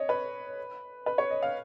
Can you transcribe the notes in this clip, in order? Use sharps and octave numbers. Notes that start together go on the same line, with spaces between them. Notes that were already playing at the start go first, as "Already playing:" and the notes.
Already playing: C#5 D#5
B4
B4
C#5
D#5
F5